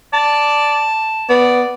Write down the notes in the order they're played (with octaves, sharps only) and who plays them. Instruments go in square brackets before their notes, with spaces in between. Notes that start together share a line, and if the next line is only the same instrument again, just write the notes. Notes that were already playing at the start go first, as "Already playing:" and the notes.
[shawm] D5 [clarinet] A5
[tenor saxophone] B3 [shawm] D5